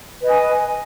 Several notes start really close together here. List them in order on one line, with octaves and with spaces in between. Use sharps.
B4 D#5 D#6 G#5